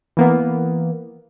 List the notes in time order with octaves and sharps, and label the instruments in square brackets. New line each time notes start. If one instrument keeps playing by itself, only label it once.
[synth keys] E3 A#3 B3